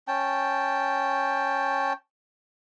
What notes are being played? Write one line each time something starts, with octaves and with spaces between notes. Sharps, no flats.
C#4 G5 A5